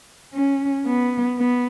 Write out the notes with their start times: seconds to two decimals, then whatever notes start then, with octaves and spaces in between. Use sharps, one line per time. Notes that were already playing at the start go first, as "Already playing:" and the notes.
0.33 C#4
0.85 B3
1.38 B3